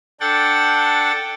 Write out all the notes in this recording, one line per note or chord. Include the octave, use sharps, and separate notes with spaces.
D4 A4 F#5 G5 A6